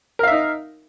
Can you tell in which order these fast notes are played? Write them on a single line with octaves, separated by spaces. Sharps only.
A#4 F5 E5 D#4